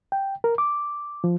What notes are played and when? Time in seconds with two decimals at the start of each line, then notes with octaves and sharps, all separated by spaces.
0.12 G5
0.44 A#4
0.58 D6
1.24 F3